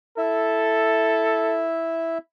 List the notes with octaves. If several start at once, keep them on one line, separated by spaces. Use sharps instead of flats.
E4 A4 E5